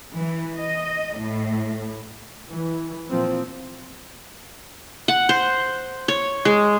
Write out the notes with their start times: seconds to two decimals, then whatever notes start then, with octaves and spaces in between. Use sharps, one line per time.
0.13 E3
0.57 D#5
1.17 A2
2.51 E3
3.11 A#2 F3 C4
5.08 F#5
5.29 C5
6.08 C#5
6.45 G#3